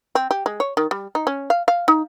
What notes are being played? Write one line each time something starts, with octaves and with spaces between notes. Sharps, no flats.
C4
G4
G#3
C#5
D#3
G3
D#4
C#4
F5
F5
D#4